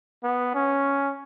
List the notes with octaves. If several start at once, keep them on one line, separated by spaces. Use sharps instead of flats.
B3
C#4